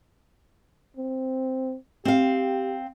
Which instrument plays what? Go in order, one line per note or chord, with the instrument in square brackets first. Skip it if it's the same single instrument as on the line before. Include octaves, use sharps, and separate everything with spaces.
[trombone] C4
[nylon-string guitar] C4 F5 [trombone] G4